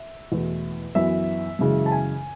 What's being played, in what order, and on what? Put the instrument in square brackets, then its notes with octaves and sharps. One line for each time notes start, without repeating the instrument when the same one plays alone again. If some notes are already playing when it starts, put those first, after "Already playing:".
Already playing: [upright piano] E5
E2 B2 A3
F#2 E3 B3 E5
F#2 C#3 E3 G#3
A5
G#5